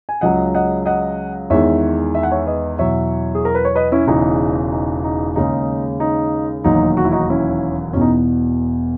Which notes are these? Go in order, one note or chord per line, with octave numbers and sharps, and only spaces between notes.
G#5
C#2 C#3 F#3 D#5 F#5
D#5 F#5
D#5 F#5
E2 D#3 G#3 C#5 E5
E5
F#5
C#5 E5
B4 D#5
E2 B2 F#3 C#5 E5
G#4
A#4
B4
C#5
B4 D#5
C#4 E4
E1 E2 C#3 E3 D#4
D#4
D#4
D#2 C#3 G#3 D#4
D#4
E1 D#2 D#3 F#3 D#4
F#4
E4
D#4 F#4
C#4 E4
E1 E2 B2 C#4
D#4